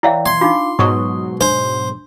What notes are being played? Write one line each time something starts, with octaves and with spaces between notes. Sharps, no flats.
E3 E4 C#5 D5 E5 F5 G5
C6 G#6
D4 D#4 F4 F5 D6
G#2 B2 F#3 C#6 D#6
D4 C5 C6